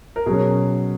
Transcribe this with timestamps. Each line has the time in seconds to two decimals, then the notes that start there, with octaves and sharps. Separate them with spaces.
0.16 A#4
0.26 B2 F#3 C#4 G#4